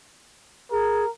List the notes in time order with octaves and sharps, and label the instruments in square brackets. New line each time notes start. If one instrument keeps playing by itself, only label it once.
[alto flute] G#4 [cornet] A#4